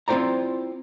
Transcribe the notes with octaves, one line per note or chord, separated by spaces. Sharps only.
C4 E4 F4 C5 D5 A#5